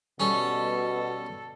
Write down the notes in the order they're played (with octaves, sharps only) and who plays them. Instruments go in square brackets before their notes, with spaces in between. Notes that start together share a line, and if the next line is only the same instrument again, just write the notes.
[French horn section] B2 [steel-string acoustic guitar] G3 [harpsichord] C#4 [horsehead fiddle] A4